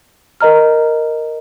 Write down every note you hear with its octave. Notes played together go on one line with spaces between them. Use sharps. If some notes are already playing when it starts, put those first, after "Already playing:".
A#4 D#5 A#5 F6